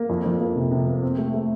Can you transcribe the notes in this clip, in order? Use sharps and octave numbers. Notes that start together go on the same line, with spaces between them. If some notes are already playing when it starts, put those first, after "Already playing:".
Already playing: A#3
F2
F2
A#3
C3
C3
A#3
C4
A3
A3